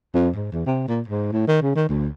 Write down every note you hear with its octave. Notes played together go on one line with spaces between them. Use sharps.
F2
G#2
E2
C3
A#2
G#2
A2
D#3
C#3
D#3
D2